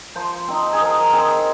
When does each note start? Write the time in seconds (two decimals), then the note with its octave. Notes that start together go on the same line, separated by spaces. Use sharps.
0.15 F3 C5
0.48 C4 D#4
0.73 G#4
0.81 F3 A#4
1.13 C4 D#4 G#4